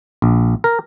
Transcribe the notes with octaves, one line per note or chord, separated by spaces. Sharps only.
A#1
A#4